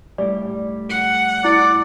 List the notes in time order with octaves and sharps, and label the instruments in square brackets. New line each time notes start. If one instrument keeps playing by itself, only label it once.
[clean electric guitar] A2 G3 [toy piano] D5
[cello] F#5
[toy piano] E4 [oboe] D5